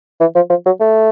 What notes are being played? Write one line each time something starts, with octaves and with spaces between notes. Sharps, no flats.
E3
F3
F3
F#3
A3